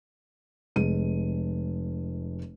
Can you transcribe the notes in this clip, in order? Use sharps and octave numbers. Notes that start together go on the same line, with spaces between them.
F1 G#3 D#7